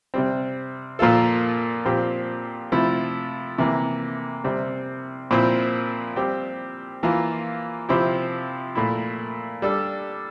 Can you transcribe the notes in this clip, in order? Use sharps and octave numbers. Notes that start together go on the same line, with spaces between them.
C3 G3 C4
A#2 F3 A#3 F4 A4
A#2 F3 C4 G4
C3 F3 A3 E4 A4
C3 E3 A#3
C3 G3 C4
A#2 F3 C4 E4
G3 C4 G4
E3 A#3 F4
C3 F3 C4 E4 G4
A#2 A3 E4
G3 D4 A4